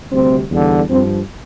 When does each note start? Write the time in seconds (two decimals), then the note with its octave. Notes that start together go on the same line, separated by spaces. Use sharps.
0.12 D2 C3 G3 C4
0.51 E2 D3 G3
0.90 G2 F3 C4